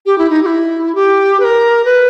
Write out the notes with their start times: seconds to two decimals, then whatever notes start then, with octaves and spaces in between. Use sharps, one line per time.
0.06 G4
0.18 E4
0.30 D#4
0.43 G4
0.46 E4
0.95 G4
1.40 B4
1.44 A#4
1.85 B4